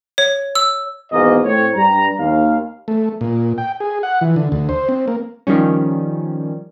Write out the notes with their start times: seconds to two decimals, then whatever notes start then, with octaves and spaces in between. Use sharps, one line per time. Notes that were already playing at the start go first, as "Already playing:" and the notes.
0.18 C#5
0.55 E6
1.11 G#1 E2 G#2 B2 A#3 D#5
1.45 A2 C4 C#5
1.75 G2 G3 A#5
2.19 D#2 F5
2.88 A3
3.21 A#2
3.58 G5
3.80 G#4
4.03 F#5
4.21 E3
4.36 D3
4.52 D2
4.69 C5
4.89 C4
5.08 A#3
5.47 D#3 F3 G3 C#4